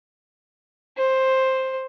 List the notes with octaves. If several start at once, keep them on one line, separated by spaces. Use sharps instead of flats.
C5